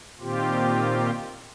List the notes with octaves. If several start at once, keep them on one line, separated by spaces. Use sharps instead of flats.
A#2 D#3 C4 F4 G4